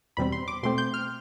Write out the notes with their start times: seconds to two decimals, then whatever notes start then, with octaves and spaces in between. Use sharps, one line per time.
0.17 E2 B2 G3 C4 B5
0.32 C6
0.48 D6
0.63 B2 A3 C4 C6
0.78 G6
0.94 F6